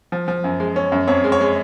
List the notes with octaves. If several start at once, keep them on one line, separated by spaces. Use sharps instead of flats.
F3
F3
F#2
G#3
C#4
F#2
F2 C#5
G#3
C#5
G#3